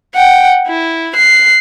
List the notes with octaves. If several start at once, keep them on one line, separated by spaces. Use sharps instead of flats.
F#5 G5
E4
F#6 C7